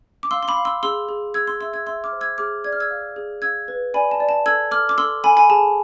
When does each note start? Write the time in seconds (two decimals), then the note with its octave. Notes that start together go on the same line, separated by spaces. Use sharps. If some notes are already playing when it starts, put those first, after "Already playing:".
0.23 D6
0.31 F5 C6 E6
0.43 C6
0.48 B5 D6
0.57 F5
0.65 C6 E6
0.83 G#4 C6 E6
1.09 G#4
1.34 G#4 E6 G#6
1.47 C6 E6
1.61 E5 C6 E6
1.73 E6 G#6
1.86 E5 C6 E6
2.04 D6 F6
2.12 C5
2.21 E6 G#6
2.38 G#4 D6 F6
2.64 D5 G#6
2.73 F6
2.80 E6 G#6
2.90 F5
3.16 G#4
3.42 F5 E6 G#6
3.68 B4
3.94 D5 G#5 B5
4.11 A5
4.20 D5
4.29 A5
4.46 A4 E6 G#6
4.71 A4 D6 F6
4.89 D6
4.98 A4 C6 E6
5.24 A4 G#5 B5
5.37 G#5 B5
5.50 G#4 A5